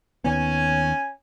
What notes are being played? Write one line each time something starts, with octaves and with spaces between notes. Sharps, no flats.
D#2 D#3 B3 C#4 G#5